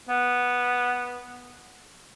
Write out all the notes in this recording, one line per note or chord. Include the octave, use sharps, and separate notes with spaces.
B3